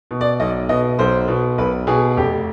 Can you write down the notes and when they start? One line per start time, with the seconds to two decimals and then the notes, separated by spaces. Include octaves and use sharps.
0.11 B2
0.21 D5
0.40 B1 D#5
0.69 B2 D#5
0.99 B1 C5
1.28 B2
1.58 B1 B4
1.87 B2 G#4
2.17 F1 G4